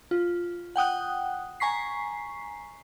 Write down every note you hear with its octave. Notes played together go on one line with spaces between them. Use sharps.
F4
F#5 G5 D#6 F#6
G#5 A#5 C#6 B6 C7